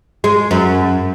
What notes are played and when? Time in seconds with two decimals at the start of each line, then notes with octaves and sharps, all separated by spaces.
0.24 G#3
0.51 F#2